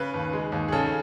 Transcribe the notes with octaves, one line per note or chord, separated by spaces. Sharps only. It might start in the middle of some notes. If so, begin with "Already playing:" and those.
Already playing: C#3 B4
D#2
G#3
D#2
G#4
C#3 A4